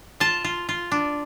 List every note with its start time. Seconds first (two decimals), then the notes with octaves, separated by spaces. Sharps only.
0.20 F4 A5
0.44 F4
0.69 F4
0.92 D4